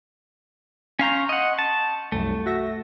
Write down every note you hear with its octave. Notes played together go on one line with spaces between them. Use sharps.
C#4 F5 A#5 C6 C#6 G6
D#5 F#5
A5
C2 F#2 A3
F#4 E5 A#6